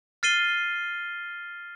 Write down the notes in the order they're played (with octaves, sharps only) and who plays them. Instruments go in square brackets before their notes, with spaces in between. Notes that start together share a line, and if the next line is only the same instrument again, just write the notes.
[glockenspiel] F6 A6 C7 D#7 G7